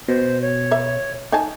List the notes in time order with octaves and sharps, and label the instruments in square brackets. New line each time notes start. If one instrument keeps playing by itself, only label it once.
[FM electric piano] B2 [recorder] C5
[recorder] C#5
[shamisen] B4 E5
D#4 G#5 A5